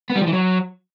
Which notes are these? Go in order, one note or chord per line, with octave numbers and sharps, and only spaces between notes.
B3
G3
F3
E3
F#3